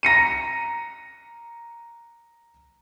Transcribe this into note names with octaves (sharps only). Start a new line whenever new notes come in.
A#5 A#6 C#7 D#7